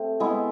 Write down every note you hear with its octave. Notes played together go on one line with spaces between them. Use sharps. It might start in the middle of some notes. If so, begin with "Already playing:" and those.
Already playing: A3 C4 G4
G#3 B3 E4